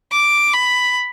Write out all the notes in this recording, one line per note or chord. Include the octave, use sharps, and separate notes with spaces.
D6
B5